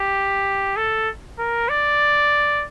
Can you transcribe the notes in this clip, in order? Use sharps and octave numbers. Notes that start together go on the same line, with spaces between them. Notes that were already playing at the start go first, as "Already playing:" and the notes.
Already playing: G4
A4
A#4
D5